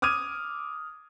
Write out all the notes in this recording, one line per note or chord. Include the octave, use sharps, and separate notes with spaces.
D6 D#6 F6 G#6 D#7